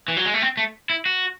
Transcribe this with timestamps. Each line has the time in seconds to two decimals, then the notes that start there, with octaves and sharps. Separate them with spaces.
0.08 E3
0.17 F#3
0.25 G#3
0.34 A3
0.42 C4
0.57 A3
0.89 E4
1.06 F#4